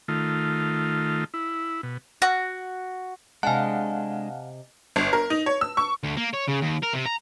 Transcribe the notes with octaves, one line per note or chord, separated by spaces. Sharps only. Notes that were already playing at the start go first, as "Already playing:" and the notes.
D#3 A3 F4
E4
B2
F#4
C3 G#3 D4 D#5 F5 F#5 G#5 A5
G1
A#4
D#4
C#5
E6
C#6
D2
A#3
C#5
C#3
D#2
A#4
C3
A#5